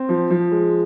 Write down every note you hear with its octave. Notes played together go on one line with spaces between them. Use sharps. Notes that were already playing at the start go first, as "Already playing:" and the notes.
Already playing: C4
F3
F3
G#3